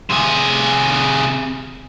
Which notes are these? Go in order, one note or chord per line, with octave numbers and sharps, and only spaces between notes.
C3 G#4